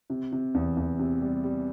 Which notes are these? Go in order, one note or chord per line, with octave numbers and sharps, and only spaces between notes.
C3
C3
E2
E2
C3
G3
G3